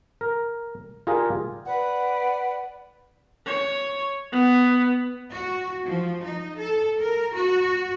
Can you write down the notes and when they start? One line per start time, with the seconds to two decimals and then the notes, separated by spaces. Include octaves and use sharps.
0.21 A#4
1.07 F4 G4 G#4 A#4 D5
1.65 B4 D5 F#5
3.46 C#5
4.32 B3
5.31 F#4
5.85 F3
6.25 D#4
6.60 A4
6.99 A#4
7.35 F#4